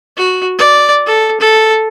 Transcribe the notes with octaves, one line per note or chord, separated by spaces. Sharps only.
F#4
D5
A4
A4